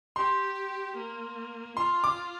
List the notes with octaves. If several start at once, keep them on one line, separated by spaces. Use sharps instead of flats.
G4 C6
A#3
F4 C6
D6